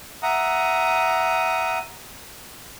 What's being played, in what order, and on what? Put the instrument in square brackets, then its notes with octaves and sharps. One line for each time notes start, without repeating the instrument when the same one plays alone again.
[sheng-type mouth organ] E5 F#5 A#5 D#6